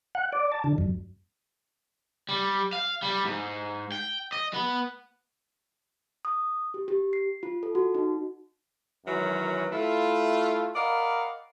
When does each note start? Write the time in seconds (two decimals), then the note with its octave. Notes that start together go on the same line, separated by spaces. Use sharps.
0.15 F#5
0.32 D5
0.52 A5
0.64 D3
0.78 F#2
2.29 G3
2.73 F5
3.03 G3
3.25 G#2
3.92 G5
4.32 D#5
4.54 B3
6.25 D#6
6.74 G4
6.88 G4
7.13 C7
7.43 F4
7.63 A4
7.75 F#4
7.95 D#4
9.06 F#2 D#3 E3 F#3 G#3 C#4
9.72 A3 E4 F4
10.75 A#4 D5 D#5 F5 F#5 B5